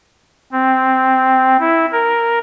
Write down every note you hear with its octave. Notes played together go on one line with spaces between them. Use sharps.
C4
E4
A#4